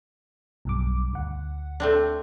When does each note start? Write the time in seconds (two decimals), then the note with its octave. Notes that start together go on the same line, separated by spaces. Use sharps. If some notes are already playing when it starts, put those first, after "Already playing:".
0.65 B1 G2 D6
1.13 D2 F#5
1.80 A3 C4 D4